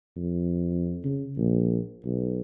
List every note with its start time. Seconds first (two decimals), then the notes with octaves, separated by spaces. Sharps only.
0.16 F2
1.04 C#3
1.37 A#1
2.05 B1